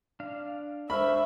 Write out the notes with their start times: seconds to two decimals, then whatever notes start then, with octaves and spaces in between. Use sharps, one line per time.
0.20 D4 F5
0.90 D4 C5 E5 B5 C#6 F6